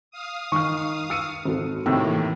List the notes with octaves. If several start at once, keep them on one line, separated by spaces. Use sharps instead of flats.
F5 D#6
D#3 C#6 F6
E6 C#7 D#7
G#1 F#4 A4
A2 C3 D#3 E3 A#3 E6